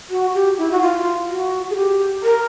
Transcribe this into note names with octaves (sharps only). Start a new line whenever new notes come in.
F#4
G4
E4
F#4
F4
F#4
G#4
G4
A#4